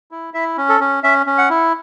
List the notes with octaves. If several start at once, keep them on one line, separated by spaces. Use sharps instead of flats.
E4
E4 E5
C#4
A4
C#4
C#4 E5
C#4
F#5
E4